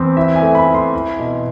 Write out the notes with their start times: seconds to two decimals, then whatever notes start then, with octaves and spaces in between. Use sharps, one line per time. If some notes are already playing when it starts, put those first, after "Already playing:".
Already playing: E2 C4
0.17 E4 E5
0.36 G#5
0.42 A3
0.55 B5
0.68 E4
0.74 C6
0.94 E4
1.19 B2